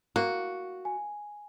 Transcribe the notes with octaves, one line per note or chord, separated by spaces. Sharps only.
A#3 F#4 F#6
G#5